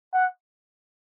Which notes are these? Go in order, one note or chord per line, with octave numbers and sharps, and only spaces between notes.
F#5